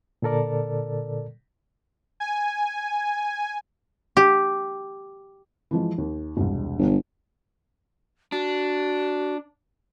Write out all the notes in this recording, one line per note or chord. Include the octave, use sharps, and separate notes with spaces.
A#2 D3 A4 A#4 D5
G#5
G4
E3 F3 G#3
D#2
E1 C2
G1
D4 F#4